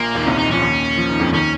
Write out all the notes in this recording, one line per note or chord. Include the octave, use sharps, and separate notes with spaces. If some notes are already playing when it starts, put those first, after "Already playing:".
Already playing: A#1 A#2 A#3
D#2 D#3 C4
C2 C3 C#4
D#4
F3 C#4
D#2 D#3
F3
D#3
F2 F3
D#2 D#3 C#4